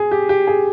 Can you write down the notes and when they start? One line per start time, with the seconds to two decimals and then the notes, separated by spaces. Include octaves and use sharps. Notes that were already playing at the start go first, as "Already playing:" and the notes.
Already playing: G#4
0.11 G4
0.29 G4
0.47 G#4